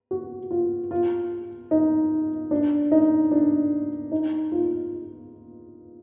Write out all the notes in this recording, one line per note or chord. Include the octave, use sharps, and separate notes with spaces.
F#4
F4
F4
D#4
D4
D#4
D4
D#4
F4